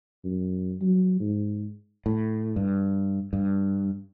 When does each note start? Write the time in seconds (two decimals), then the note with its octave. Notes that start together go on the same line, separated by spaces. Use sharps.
0.25 F#2
0.81 F#3
1.20 G#2
2.06 A2
2.56 G2
3.33 G2